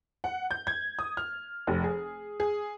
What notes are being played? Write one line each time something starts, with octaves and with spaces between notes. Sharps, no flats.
F#5
G6
G#6
D#6
F6
F1
G#4
G#4